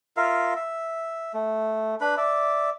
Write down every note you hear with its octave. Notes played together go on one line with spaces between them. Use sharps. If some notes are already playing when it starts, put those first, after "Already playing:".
F4 A#4 E5 F5
E5
A3
D4 B4 B5
D5 E5